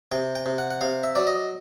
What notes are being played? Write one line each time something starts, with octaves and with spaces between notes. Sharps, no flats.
C3 G5
G5
C3
F#5
F#5
C3 F5
E5
F#3 D5
D#5